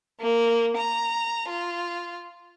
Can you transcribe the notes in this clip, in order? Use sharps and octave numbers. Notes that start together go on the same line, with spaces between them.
A#3
A#5
F4